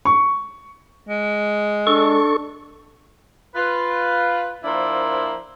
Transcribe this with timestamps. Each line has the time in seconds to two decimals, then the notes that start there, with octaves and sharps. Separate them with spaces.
0.05 C#6
1.09 G#3
1.87 D4 A4 C#6
3.55 F4 B4
4.64 F3 A#3 D4 E4 A#4 C5